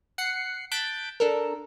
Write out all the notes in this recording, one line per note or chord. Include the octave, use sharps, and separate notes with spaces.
F#5 F#6 C7 C#7
A5 F#6 G6 A6 B6 D7
D4 A4 A#4